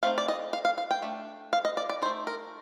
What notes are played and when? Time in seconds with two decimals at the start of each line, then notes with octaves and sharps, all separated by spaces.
0.03 A3 C4 D#4 F5
0.18 D5
0.28 D#5
0.53 F5
0.65 F5
0.78 F5
0.91 G5
1.02 A3 D4
1.53 F5
1.65 D#5
1.77 D5
1.89 D5
2.02 D#4 C5
2.05 A3
2.27 A#4